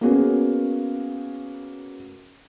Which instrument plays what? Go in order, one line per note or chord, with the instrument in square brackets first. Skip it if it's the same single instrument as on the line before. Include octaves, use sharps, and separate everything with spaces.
[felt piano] A#3 B3 C#4 F#4 G#4 A#4